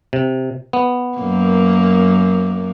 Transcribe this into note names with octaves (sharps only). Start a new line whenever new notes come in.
C3
B3
F#2 A#3